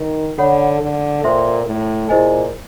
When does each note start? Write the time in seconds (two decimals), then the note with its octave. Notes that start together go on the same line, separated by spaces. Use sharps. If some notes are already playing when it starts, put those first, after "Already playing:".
Already playing: D#3
0.38 D3 A4 C#5 F#5 B5
0.81 D3
1.24 A#2 A4 C5 E5 G5 C6
1.67 A2
2.09 A#2 E4 G#4 C5 D#5 G#5